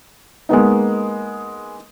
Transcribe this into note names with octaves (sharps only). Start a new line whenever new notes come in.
G#3 A#3 B3 D#4